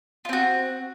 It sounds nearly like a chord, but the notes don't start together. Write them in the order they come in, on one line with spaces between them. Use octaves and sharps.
F4 C4 F#4